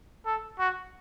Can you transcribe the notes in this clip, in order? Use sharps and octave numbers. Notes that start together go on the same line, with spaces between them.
A4
F#4